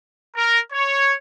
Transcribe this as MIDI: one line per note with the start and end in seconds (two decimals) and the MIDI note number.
0.37 0.59 70
0.73 1.14 73